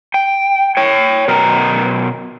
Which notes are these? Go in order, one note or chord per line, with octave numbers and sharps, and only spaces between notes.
G5
C#5 G5
B2 F#3 A#4 A#5